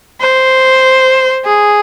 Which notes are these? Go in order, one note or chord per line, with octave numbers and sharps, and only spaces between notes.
C5
G#4